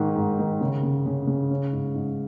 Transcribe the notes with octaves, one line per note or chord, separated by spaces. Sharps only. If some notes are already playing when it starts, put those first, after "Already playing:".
Already playing: G#2 D#3 D#4
G#2
D#3
C#3
C#3
C#3
C#3
C#4
G#2
G#2